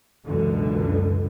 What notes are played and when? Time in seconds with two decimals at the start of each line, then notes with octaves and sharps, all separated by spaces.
0.25 C#2 F#2 B2 D3 E3